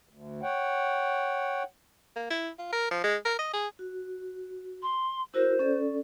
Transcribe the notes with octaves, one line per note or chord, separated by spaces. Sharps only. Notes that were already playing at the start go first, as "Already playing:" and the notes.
D2
C#5 F#5 G5
A#3
E4
F4
A#4
F3
G#3
A#4
D#5
G#4
F#4
C6
E4 F#4 A#4 C5
C#4 A4 D5